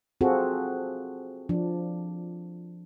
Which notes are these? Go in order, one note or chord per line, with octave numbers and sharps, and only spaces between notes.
C4 F4 F#4 G#4 A4
F3 D4